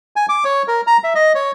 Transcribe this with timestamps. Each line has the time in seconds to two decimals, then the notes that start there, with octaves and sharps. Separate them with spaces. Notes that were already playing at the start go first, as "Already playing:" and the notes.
0.16 G#5
0.29 D6
0.45 C#5
0.68 A#4
0.87 A#5
1.04 E5
1.15 D#5
1.35 C#5